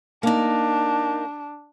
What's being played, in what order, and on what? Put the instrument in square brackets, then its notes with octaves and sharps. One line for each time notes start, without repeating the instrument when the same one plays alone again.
[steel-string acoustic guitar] A#3 D#4 [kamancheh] D4